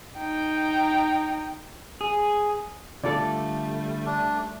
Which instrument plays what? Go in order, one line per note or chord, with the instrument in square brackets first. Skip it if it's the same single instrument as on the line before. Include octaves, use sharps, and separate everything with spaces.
[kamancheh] D#4 G5
[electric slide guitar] G#4
[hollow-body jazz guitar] D3 F4 A4 [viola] G3 A3 [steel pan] D5
[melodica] D4